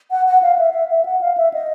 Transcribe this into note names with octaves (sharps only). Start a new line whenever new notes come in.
F#5
F#5
F5
E5
E5
E5
F#5
F5
E5
D#5